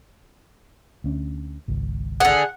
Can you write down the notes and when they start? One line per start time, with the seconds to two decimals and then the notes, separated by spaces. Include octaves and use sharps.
1.04 D2 C#4
1.68 G#1 C#2
2.20 D3 G#4 F#5